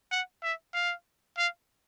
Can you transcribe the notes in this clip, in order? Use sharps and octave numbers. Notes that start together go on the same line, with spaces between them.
F#5
E5
F5
F5